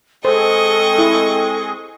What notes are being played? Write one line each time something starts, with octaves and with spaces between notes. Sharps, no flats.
G#3 C4 G#4 A4 C5 D#5 C#6
E4